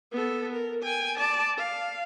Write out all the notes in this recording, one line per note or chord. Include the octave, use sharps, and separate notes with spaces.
B3 A4
A#4
G5 G#5
D5 A5
F5